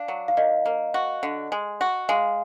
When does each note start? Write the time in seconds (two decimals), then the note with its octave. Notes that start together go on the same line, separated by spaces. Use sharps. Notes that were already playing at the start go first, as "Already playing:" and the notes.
Already playing: D4 F5
0.08 F#3
0.28 F5
0.37 D#3 D#5
0.66 A#3
0.94 F#4
1.23 D3
1.52 G#3
1.81 F#4
2.09 G#3 F5